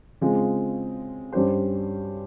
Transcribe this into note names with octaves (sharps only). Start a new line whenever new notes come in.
C#3 G#3 C4 F4 G#4
G2 G3 C#4 G4 C5